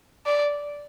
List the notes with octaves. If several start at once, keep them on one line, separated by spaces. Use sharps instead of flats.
D5